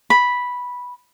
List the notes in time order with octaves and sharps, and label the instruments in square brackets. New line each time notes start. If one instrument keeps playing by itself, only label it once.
[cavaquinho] B5